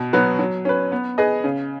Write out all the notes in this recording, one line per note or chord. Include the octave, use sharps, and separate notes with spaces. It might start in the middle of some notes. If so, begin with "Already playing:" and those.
Already playing: B2
F#3 B3 F#4 B4
F#3
C#4 B4
B3
G#4 B4 D#5
C#3